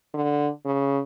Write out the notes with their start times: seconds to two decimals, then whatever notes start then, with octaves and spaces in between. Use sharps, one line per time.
0.14 D3
0.65 C#3